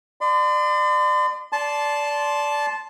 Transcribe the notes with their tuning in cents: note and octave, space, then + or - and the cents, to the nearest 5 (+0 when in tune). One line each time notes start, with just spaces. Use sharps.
D5 +35 C6 -40
D5 -15 A5 -10 C6 +0